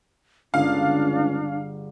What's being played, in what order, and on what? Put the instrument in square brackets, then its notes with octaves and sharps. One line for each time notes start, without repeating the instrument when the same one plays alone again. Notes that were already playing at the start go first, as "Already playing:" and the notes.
[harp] G1 G#4 [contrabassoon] C#2 [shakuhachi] D4 [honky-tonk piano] F5